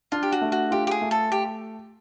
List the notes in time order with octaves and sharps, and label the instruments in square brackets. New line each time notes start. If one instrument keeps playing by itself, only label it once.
[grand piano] D4 [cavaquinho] F4
[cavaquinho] G4
F#4
[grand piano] A3
[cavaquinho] F#4
[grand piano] F4 [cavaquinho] G4
[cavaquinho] G4
G#4
[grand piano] A3
[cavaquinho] A4
G4